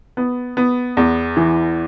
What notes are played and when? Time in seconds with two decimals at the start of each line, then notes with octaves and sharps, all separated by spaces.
0.17 B3
0.57 B3
0.97 E2
1.37 E3